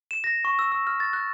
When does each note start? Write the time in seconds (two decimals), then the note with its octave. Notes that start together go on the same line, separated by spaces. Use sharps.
0.11 E7
0.24 A#6
0.45 C#6
0.59 E6
0.72 E6
0.87 F6
1.00 A6
1.13 F#6